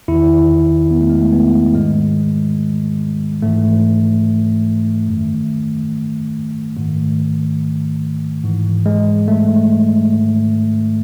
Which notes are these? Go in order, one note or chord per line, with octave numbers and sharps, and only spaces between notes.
E2 D#3 E4
B3
A3
G#3
A3
B3
G#2 D#3 G#3
G#2 E3 A3
F#2 D#3
G#2 D#3 A3
G#2 E3
G#3
A3
G#2 D#3